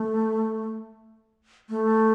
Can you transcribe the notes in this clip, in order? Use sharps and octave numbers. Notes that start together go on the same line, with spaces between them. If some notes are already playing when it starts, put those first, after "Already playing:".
Already playing: A3
A3